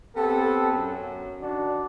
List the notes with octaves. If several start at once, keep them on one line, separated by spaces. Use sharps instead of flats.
B3 C4 G4 A4
F#2
D#3 D4 F#4 D5